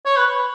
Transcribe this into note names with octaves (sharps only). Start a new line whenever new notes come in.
C#5
B4